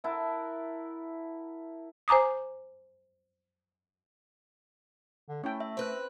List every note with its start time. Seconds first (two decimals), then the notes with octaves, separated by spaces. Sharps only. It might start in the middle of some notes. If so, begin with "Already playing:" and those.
0.04 E4 A#4 F#5 A5
2.08 C5 G#5 A#5 D6 D#6
5.28 D3
5.44 A3 C#4 E4 G5
5.60 E5
5.77 C4 B4 C5 F#6